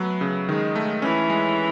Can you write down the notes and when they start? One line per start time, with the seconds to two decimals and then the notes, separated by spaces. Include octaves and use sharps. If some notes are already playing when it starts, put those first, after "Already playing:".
Already playing: F#3 A3 B3
0.21 C#3
0.48 D#3 G#3
0.75 A3
1.02 E3 C#4
1.30 G#3